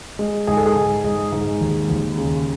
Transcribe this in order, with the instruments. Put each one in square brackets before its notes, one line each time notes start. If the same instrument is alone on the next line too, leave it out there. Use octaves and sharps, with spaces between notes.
[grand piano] G#3
G#2 G#4
A4
G#4
G#2
G#2
G#2
D#2
D#2
C#3